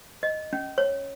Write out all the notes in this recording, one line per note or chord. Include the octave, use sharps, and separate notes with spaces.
D#5
C#4
C#5